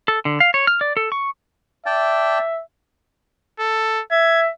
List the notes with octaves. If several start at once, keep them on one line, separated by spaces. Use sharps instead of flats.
A4
D3
F5
C#5
F6
D5
A4
C#6
D5 E5 G5 A5
A4
E5 G#6